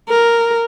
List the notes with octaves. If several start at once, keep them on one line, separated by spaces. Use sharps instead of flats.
A#4